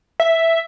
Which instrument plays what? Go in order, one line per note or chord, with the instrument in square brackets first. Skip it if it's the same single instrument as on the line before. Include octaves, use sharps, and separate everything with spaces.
[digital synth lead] E5